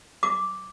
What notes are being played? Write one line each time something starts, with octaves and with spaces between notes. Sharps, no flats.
D6